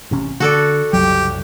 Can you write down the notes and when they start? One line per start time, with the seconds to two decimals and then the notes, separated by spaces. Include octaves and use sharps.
0.11 A1 C3 C#4
0.40 D3 F#4 A4 D5
0.93 F#1 C2 F#3 G4